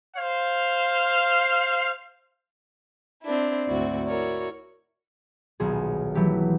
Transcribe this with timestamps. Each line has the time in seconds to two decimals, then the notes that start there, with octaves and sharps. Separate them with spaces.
0.16 C5 F5
3.24 C4 D4 E4
3.67 D2 G#2 C4 E4 F#4 D5
4.07 E4 F#4 A#4 C#5 D5
5.60 D#1 B1 G#4
6.15 E3 F#3 A3 G4 B6